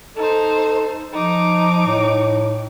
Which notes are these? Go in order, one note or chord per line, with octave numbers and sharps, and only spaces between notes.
D#4 A4 C5
F3 D#4 D6
A2